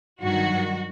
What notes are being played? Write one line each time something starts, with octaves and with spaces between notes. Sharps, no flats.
G2 D#3 F#3 F#4